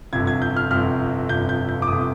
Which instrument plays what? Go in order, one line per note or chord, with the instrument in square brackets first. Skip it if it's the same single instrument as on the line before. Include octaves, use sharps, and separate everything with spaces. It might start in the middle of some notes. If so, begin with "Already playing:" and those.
[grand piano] G1 F2 C3 G#6
G#6
G6
F6
G1 F2 C3 F6
G1 F2 C3 G6
G6
G6
D6
G1 C3 D#6